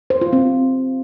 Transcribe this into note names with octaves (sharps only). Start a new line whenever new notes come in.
C5
F4
C4